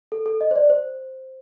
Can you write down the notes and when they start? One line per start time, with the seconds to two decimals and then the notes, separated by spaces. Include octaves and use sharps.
0.12 A4
0.26 A4
0.41 D#5
0.51 C5
0.56 D5
0.70 C5